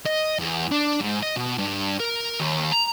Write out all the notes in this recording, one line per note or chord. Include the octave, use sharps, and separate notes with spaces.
D#5
E2
D4
G#2
D#5
B2
G2
A#4
D#2
A#5